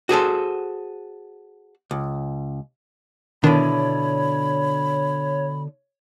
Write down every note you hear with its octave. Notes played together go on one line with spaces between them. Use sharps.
F#4 G#4 A4 C5
C#2
B2 D3 D#3 D4 E4 C#5 B5